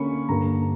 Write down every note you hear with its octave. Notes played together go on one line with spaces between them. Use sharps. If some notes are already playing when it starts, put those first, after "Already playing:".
Already playing: D3 A#3 C#4 B5 C#6
G2 D3 A#3 A#5